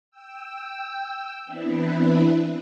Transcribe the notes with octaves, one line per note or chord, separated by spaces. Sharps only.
G5 E6
E3 B3 C4 D4 E4 B4